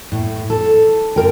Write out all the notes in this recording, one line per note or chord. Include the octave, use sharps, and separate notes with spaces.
A2
A4
F#2 A#4 G5